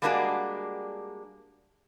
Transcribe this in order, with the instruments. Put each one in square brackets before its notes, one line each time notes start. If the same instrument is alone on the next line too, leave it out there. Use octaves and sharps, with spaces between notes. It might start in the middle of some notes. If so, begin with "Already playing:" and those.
[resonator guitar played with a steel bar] G3 G#3 A#3 D4 F#4 G#4